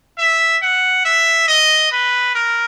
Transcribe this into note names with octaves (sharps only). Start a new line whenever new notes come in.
E5
F#5
E5
D#5
B4
A#4